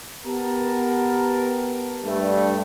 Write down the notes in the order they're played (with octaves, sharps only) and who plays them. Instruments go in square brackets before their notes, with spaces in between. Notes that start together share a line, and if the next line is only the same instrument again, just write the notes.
[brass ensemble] B3 G4 A#4 A5
G2 A3